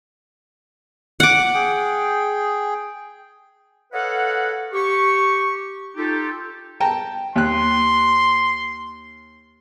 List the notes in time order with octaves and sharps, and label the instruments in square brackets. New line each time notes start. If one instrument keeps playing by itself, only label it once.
[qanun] F#5 D6
[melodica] G#4 G5
[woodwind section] A4 B4 C#5 D#5 F5 F#5
G4 C#6
D#4 F4 G4 A4
[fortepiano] G5 A5 A#5
[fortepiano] D#2 F#6 [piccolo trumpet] C6